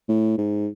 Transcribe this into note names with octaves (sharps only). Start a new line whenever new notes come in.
A2
G#2